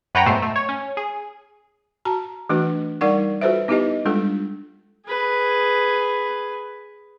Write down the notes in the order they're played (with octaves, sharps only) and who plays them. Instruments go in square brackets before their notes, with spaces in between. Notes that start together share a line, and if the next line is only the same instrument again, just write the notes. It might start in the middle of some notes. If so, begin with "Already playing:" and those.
[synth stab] F#2 B4 C#5 F#5 G5 A#5
G#2 B2 A3 C5
A3
C#5
C#4
G#4
[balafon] F#4 A5 A#5
E3 A3 D4 F#4 B4
G3 D#4 A#4 D5 F#5 C#6
F4 F#4 A4 B4 C5 E5
B3 D#4 E4 G4 B4 D#5
G3 G#3 D4 F4 A4
[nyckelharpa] G#4 B4